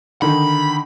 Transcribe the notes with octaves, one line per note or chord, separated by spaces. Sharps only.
D3 D#3 D#4 B5